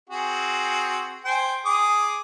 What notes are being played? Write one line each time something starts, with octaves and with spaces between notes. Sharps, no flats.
C4 F#4 G#4
C5 G5 G#5
G#4 D6 D#6